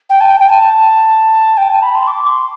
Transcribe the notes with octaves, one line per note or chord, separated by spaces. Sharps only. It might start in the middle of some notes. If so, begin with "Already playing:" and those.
G5
A5
G5
G5
A5
G5
A5
B5
C6
D6
C6